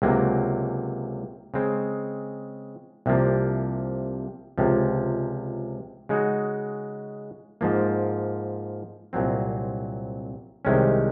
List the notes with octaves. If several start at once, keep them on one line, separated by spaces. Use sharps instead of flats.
C#2 C3 F#3 A#3
C#3 G#3 C4
C2 C3 F3 A#3
C#2 C3 F3
C#3 G#3 D#4 F#4
G#2 F3 A#3
C2 A#2 F#3 C4
C2 C3 D#3 G#3 C#4